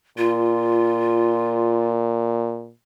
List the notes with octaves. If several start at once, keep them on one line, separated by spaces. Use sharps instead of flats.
A#2 F4